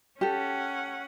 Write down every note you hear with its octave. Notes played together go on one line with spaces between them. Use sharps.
C#4 G4 A4 F#5